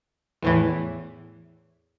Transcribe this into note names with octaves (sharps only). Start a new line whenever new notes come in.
E2 A2 E3